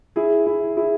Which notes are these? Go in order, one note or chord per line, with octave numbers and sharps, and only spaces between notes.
E4 G#4
E4
E4 G#4